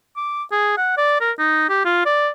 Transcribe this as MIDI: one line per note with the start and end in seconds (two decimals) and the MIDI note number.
0.17 0.43 86
0.52 0.73 68
0.77 0.94 78
0.97 1.18 74
1.20 1.31 70
1.39 1.66 63
1.69 1.82 67
1.85 2.05 65
2.06 2.30 74